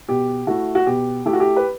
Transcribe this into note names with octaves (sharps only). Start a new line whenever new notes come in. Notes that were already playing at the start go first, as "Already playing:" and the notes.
B2 G4
A3 E4 F#4
F#4
B2 G4
A3 E4 G4
F#4
G4
B4